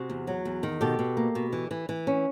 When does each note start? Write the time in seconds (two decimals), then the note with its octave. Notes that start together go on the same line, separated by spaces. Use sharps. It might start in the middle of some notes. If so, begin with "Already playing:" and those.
Already playing: C3 F#4 G#4
0.10 E2
0.27 F#3
0.45 E2
0.63 D#3
0.81 B2 G4 A4
0.99 B2
1.17 A#3
1.35 B2
1.53 E3
1.71 E3
1.89 E3
2.07 C#4